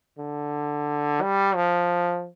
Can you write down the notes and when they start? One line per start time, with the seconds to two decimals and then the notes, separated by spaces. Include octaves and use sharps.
0.18 D3
1.22 G3
1.55 F3